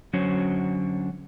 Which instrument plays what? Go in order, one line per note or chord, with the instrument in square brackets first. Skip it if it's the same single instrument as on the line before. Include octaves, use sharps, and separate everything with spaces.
[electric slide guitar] D3 F#3 C#4 C5 C#5